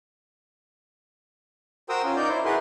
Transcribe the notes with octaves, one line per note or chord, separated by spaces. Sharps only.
F#4 A#4 C5 G5 D#6 E6
C#4 F4
D#4 A#4 D5 G6
E4 C5
E4 F#4 G#4 A#4 B4 C6